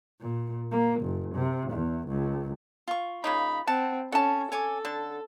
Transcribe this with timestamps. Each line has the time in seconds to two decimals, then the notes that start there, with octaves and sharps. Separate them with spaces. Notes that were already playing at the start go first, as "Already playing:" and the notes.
0.20 A#2
0.71 A#3
1.01 F#1
1.35 C3
1.71 E2
2.08 C#2
2.88 F4 C#6
3.24 C#3 A#3 D#4 B5
3.67 C4 F#5 A5
4.12 C#4 A4 F#5 A5
4.52 A4 C#5 G#5 D6
4.85 D3 A5